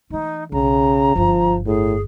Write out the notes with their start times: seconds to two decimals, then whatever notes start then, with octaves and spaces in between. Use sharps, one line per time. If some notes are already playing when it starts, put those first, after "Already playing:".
0.10 E3 A3 D#4
0.52 B1 C#3 A#5
1.16 G1 G2 F3
1.66 A2 G#4